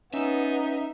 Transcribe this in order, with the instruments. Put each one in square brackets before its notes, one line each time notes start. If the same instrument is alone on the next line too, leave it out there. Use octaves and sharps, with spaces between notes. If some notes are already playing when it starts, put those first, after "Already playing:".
[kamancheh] B3 [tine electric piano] C#4 [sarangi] D#4 [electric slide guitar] E5